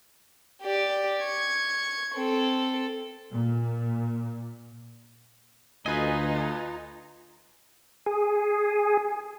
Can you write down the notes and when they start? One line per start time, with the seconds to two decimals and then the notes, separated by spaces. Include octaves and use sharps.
0.62 G4 D5
1.24 C#6 G#6
2.15 C4 A4
3.31 A#2
5.86 D2 D#4 F4 B4 D#5 G#5
8.06 G#4